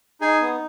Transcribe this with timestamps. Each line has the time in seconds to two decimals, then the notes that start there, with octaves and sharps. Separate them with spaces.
0.21 D#4 G#4 G#5
0.41 B3